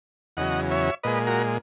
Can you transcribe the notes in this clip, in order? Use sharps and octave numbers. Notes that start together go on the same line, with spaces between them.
E2 C#3 F#3 D#5 F#5
C#5 E5
A#2 G#3 B4 D#5
F#4 A#4